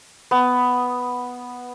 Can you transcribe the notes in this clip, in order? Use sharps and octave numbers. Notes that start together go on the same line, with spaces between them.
B3